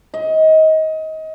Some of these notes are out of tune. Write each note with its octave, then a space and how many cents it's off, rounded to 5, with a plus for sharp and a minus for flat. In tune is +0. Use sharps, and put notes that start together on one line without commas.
D#5 +25